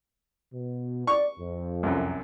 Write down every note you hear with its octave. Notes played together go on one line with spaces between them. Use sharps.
B2
D5 C#6
F2
C2 F#2